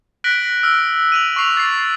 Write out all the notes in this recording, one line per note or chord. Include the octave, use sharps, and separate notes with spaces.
F#6 A#6 B6 D7 F#7
E6 F6
D#7 F7 F#7
C#6 D6 C7 F7
A6 C7